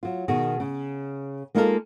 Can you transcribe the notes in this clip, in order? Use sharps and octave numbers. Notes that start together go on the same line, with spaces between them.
F#3 F4
B2 D#3 F#4 G#4
C#3
G#3 A#3 D#4 F4 A4 A#4